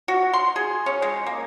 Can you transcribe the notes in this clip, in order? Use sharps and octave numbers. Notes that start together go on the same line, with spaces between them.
F#4
C6
G#4
C#4
G#3
A#3